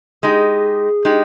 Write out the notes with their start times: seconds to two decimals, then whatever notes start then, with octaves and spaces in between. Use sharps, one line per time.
0.23 G#3 D#4 G4 G#4
1.05 G#3 D#4 G4